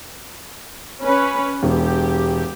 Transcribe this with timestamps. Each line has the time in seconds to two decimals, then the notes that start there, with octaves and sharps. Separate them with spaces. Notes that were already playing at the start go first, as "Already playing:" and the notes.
1.04 C#4 B4
1.63 E1 G4